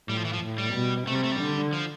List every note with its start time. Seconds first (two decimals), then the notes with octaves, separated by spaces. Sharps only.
0.08 A2 G3
0.17 F3
0.25 E3
0.33 F3
0.42 A2
0.58 G3
0.75 B2
1.07 C3 A3
1.15 G3
1.23 A3
1.32 G3
1.40 D3
1.73 F3